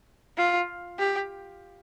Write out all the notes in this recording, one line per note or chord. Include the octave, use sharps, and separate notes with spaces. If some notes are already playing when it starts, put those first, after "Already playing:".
F4
G4